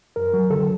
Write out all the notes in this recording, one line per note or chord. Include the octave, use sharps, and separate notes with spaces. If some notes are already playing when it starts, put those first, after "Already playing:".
F#2 A#4
F#3
D3 A4